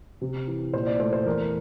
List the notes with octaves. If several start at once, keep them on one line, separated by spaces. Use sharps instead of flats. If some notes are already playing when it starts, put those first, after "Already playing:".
C3
E3
A#2 C5
D5
A3 C5
C5
E2 A#4